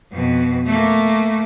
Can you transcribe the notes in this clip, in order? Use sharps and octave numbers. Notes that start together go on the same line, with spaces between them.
F2 B2
A3 A#3